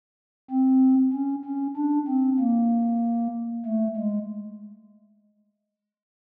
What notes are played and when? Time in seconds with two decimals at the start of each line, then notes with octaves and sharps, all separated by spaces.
0.50 C4
1.13 C#4
1.45 C#4
1.77 D4
2.08 C4
2.39 A#3
3.65 A3
3.96 G#3